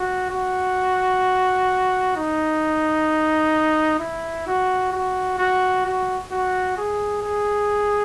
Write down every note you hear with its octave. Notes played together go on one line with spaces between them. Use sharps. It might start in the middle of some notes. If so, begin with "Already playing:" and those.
Already playing: F#4
F#4
D#4
E4
F#4
F#4
F#4
F#4
F#4
G#4
G#4